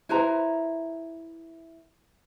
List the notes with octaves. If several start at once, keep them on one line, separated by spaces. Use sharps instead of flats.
E4 B4 C5 A#5